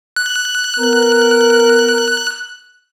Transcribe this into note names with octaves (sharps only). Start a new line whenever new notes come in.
F#6
B3 A#4